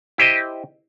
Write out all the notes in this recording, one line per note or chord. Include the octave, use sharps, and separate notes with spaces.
E4 G4 C5 D#5